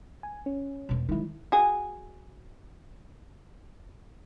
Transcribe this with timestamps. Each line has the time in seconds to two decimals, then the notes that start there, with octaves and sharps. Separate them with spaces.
0.23 G#5
0.46 C#4
0.89 E1 B2
1.09 D#3 F#3 G#3 E4
1.52 F#4 G#4